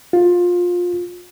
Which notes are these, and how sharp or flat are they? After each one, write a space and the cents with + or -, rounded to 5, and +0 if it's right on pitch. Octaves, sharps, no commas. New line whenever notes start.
F4 +20